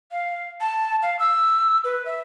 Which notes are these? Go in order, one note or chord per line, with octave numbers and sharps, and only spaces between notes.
F5
A5
F5
E6
B4
E5